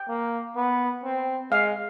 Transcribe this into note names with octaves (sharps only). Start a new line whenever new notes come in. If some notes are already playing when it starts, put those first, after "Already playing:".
Already playing: G5
A#3
B3
C4
G#3 F5